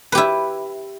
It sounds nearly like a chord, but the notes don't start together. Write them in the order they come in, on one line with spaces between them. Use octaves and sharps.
B4 G4 E4